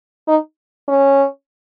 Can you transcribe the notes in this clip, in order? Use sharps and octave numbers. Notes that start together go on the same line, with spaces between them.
D#4
C#4